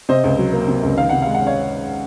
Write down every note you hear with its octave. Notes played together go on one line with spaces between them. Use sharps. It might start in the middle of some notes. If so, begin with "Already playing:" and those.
C3 C5 D#5
C#2
F#3
A#3
C3
C#2
D#3 F5
C3 F#5
G#3 F5
F#5
C#4
C#5 F5